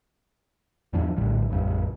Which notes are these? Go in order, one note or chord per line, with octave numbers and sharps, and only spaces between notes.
E2 G#2 F3 D4
A#1 A2 D3 G3
A1 F2 C#3 G3